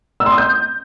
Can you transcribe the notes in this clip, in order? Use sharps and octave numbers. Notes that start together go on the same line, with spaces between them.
E6
C6
D#6
G6